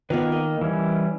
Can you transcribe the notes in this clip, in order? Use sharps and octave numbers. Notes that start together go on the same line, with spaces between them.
D#3 A#3 B3 F4 B4
A#4 D#5
E3 G3 C#4